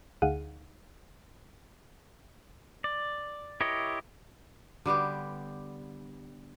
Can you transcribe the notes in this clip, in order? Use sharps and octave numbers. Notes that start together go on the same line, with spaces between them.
D2 D#4 G#4 F5 F#5 D#7
D5
E4 G4 A#4 C#5 D#5
D3 G3 B3 G4